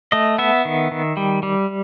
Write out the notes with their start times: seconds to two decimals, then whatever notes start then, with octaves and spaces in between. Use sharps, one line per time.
0.12 A3 D#5
0.38 B3 E5
0.65 D#3
0.91 D#3
1.17 G3
1.43 G3